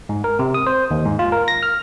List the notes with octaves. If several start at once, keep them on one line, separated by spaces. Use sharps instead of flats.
G#2
A#4
C3
D#6
C5
D#2
G#2
F4
A#4
A#6
F6